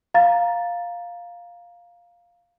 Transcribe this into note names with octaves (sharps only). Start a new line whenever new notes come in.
F5 A#5 A6